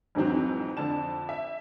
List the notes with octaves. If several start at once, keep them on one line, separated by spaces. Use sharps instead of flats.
F2 G#2 E3 F#3 C4
F2 D3 A5 E7
E5